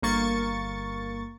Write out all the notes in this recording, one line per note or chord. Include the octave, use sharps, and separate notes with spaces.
G1 A#3 C#6 A6